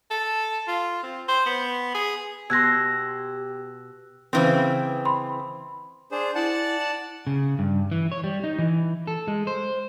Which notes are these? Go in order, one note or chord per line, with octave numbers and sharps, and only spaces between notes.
A4
F4
C4
C5
B3
G#4
B2 G4 C6 E6 F#6 G#6 A#6
C#3 E3 C4 B4 C5 C6
B5 C6
D4 G#4 C5
E4 D5 F#5 A5
C#3
G2
E3
C#5
G3
D#4
E3
A4
G#3
C5